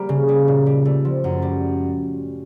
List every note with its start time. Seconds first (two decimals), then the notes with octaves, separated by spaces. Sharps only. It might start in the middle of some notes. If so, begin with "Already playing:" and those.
Already playing: G3 A#3
0.09 C#3
0.29 G3
0.48 A#2
0.66 G3
0.85 A3
1.05 F3
1.24 F#2
1.42 G3